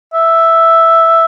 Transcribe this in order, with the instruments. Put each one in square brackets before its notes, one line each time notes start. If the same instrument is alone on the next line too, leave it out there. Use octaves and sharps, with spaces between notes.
[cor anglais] E5